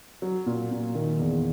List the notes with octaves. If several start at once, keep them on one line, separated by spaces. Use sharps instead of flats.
F#3
A#2
A#2
D#3
E2